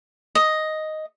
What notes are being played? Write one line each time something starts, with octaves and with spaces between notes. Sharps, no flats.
D#5